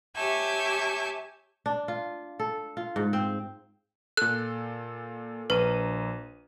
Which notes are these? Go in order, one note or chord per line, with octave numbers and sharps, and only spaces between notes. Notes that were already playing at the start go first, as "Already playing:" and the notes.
G4 C#5 E5 G#5 A5 G6
D4
F4
A4
F4
G#2
C4
A#2 A4 F#6
A#1 B4 A#5 D#7